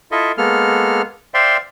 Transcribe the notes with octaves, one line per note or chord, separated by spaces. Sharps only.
E4 F4 A4 D#5 E5
G#3 A#3 B3 A4 F6
C5 D5 E5 F5 G5 C6